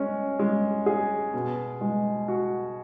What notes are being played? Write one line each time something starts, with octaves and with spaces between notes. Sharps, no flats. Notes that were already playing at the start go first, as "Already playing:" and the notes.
Already playing: G#3 C#4
G#3
G#4
B2
G#3
F#4